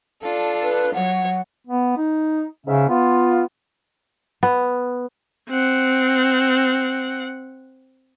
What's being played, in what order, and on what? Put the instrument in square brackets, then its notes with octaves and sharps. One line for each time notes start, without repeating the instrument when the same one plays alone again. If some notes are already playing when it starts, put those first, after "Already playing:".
[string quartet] D4 F4 A4
[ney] B4
[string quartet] F#3 C#5 [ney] F#5
[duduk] B3
D#4
[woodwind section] G#2 C#4 E5 [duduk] C#3
[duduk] B3 [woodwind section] F4
[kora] B3
[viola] C4 F#5